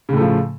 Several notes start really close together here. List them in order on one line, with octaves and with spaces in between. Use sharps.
C#3 A2 A3 F3